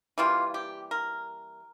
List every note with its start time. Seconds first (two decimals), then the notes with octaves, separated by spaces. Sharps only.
0.18 E3 G3 A#3 F4
0.54 G4
0.91 A#4